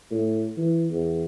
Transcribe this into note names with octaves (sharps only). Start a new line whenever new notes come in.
A2
E3
E2